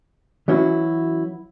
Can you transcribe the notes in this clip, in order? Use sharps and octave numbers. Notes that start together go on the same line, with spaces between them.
E3 F#3 C#4 E4 F#4